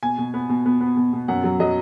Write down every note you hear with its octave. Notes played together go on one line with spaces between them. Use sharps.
B2 G#5
B2
B3
B2
B3
B3
B2
B2
F#2 F#5
F#3
F#3 D#5